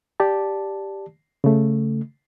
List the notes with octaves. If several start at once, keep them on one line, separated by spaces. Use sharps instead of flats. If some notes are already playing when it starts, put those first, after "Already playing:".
G4 D5 A5
C#3 A3